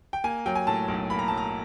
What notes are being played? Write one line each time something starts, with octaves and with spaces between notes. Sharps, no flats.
G5
A#3 G#5
F#3 G5
G#5
A2 A5
B1
A#3 B5
A#5
F#3 A5
A#5